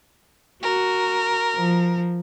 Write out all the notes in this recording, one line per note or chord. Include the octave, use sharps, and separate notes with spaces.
F#4 A#4
F3